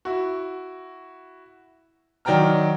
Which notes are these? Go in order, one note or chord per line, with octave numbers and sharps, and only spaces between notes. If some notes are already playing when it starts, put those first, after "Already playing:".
E4 F#4
D#3 F#3 D5 G5 A#5 F6